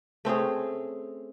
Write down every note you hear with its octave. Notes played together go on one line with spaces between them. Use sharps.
A3 C4 C#4 G#4